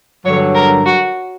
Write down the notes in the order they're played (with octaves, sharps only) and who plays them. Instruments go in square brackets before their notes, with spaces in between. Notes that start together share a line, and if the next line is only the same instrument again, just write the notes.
[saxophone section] G2 D3 F#3 [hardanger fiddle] C#5
[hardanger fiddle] A#4
F#4